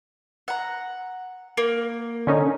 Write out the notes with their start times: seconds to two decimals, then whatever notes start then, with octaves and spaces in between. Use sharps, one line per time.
0.48 F#5 A#5
1.57 A#3
2.27 D3 C#4 D#4